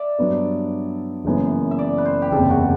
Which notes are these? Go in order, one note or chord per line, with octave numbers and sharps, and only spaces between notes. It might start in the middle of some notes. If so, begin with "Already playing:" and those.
Already playing: D5 E5
G2 F#3 B3 D4
F#1 F#2 E3 B3
E5
D5
B4
C5
G4
F#1 E2 C3 A4
F#4